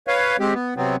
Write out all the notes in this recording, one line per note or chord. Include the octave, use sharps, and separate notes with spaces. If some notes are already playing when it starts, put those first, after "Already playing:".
B4 C#5 F5
G#3 C4 G4
B3
C3 F#3 B3 C4